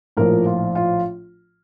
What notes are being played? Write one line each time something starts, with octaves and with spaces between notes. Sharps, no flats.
A#1 A2 F3 A#4
F4
F4